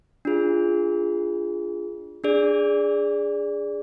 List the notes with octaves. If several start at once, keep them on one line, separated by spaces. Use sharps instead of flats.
D4 F4 G#4
D4 G#4 D5